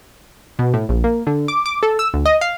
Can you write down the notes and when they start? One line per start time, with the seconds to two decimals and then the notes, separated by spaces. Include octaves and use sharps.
0.59 B2
0.74 A2
0.89 A#1
1.04 A#3
1.27 D3
1.48 D6
1.66 D6
1.83 A4
1.99 E6
2.14 D2
2.26 D#5
2.41 F5